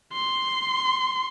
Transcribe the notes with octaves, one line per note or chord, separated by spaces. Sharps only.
C6